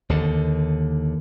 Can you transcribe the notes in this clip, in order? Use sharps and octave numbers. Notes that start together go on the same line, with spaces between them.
D#2 D3